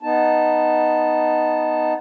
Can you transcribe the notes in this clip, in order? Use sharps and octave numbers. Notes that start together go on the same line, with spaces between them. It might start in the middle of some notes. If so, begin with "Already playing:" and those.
B3 D#4 A5